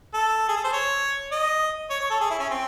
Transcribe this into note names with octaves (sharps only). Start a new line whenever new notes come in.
A4
G#4
A4
C5
C#5
D#5
C#5
C#5
A4
G#4
E4
C#4
C4